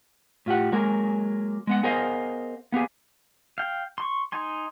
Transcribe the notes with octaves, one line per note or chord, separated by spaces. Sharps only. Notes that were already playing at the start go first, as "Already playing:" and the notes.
A2 F4 G4 F#5
F#3 G#3 A#3 G#4 A#4
G#3 B3 F#5
B3 G#4 A#4 C5 D#5 F5
A#3 B3 G4 G#4
F5 G5
C6 C#6
D#4 G#5 C6